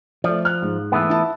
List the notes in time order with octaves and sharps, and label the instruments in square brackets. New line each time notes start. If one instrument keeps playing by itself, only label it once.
[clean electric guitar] F3 [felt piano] A3 D5
[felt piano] F6 F#6
G#2
[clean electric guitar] E3 A3 B3
[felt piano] E4 A5